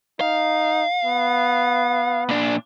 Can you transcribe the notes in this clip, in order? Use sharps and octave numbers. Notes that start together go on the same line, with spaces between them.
D#4 F5
B3
A#2 D4